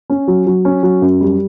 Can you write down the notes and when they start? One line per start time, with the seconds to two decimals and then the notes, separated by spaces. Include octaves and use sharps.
0.10 C#4
0.28 F#3
0.46 F#3
0.65 C#4
0.83 F#3
1.02 F#2
1.20 G3